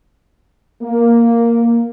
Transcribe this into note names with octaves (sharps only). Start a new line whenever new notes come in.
A#3